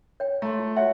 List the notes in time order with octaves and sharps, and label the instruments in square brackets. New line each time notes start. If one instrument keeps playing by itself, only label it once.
[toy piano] C#5 G5
[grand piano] A3 [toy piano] A#5 C6
[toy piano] F4
[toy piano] F#4 C#5 E5 [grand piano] F#5